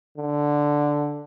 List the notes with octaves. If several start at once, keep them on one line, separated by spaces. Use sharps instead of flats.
D3